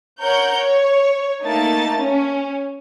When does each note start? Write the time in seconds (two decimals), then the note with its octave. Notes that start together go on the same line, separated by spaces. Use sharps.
0.21 A#4 C#5 F#5 G6
0.54 C#5
1.43 A3 A#3 D#4 A5 A6
1.99 C#4